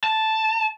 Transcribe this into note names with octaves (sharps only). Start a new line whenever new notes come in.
A5